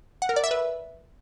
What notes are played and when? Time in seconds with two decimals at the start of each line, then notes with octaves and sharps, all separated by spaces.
0.22 F#5
0.29 A#4
0.36 D5
0.44 E5
0.51 B4